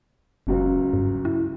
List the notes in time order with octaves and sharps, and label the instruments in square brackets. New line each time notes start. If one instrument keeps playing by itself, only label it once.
[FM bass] F#1 [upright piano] C#2 F#2 C#3
[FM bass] G2
E4